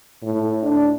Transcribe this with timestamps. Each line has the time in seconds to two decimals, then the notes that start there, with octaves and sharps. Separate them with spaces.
0.22 A2
0.63 D4